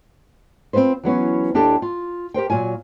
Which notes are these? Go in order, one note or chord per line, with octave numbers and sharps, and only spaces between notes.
C4 C#4 F4 B4 C5
E3 F#3 B3 C#4
D#2 D4 E4 G4 A4 A5
F4
G4 A#4 C5 G5
A#2 F#3 F4 G#5